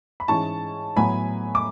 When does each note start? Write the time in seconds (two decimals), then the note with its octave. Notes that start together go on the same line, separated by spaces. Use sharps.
0.20 B5
0.28 G#2 E3 G#3 C#4 E4 A5 C#6
0.96 A2 F#3 B3 G#5 B5
1.55 D6